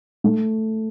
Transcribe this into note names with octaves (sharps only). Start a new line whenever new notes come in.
A3